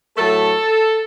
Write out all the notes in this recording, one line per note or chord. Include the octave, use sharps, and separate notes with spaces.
A2 F#3 A3 A4